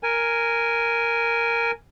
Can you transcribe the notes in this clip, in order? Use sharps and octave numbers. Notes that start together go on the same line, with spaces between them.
A#4 G#5